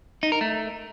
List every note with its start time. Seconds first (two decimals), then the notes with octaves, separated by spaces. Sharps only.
0.23 D#4
0.32 A#4
0.41 A3